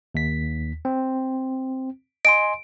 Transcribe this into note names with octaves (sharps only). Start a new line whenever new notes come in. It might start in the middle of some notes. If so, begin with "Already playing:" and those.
D#2 B6
C4
D#5 G#5 C6 D7